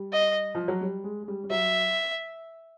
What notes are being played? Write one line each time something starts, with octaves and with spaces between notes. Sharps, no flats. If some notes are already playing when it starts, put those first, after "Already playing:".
Already playing: G3
D#5
F3
F#3
G3
G#3
G#3
G3
G3
F#3 E5